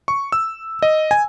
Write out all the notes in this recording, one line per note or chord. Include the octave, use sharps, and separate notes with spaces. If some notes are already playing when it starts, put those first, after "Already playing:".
C#6
E6
D#5
G#5